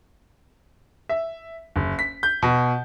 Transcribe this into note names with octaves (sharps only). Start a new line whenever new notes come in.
E5
F#1
B6
G6
B2